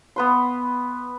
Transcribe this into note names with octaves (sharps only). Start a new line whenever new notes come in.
B3 B4 C6